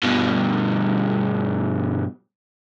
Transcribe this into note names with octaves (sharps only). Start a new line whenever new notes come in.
G2 B2